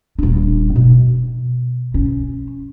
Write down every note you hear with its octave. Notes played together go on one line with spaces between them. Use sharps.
D#1 D4
B2
C#4